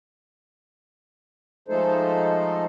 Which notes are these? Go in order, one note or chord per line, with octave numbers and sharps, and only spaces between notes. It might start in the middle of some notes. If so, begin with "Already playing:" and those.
F3 G#3 A3 D#4 A4 C5